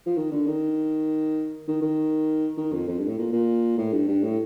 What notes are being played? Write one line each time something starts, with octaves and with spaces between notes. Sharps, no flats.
F3
D#3
D3
D#3
D#3
D#3
D#3
F2
F2
G2
A2
A#2
A#2
A2
G2
G2
A2